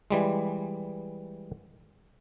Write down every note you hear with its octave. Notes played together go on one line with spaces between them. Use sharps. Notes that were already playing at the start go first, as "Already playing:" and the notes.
E3 G3 G#3